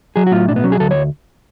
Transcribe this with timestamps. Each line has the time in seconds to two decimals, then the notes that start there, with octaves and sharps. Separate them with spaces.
0.16 F#3 G#4
0.27 F#4
0.32 A2 F4
0.48 B1 D4
0.56 B3
0.64 F#3 C#4
0.72 G#4
0.80 D2 A4
0.91 C#5